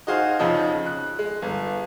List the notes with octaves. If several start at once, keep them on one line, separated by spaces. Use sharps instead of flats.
D#4 F#4 G#4 C5 F5
F2 C#3 F3 C4 D#4
F#6
G#3
G1